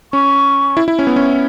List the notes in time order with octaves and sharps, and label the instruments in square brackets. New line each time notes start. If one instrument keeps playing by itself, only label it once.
[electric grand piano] C#4 [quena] C#6
[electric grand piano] E4
E4
C#4
B3
C#4